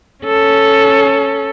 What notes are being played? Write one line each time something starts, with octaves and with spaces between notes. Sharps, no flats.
C#4 A4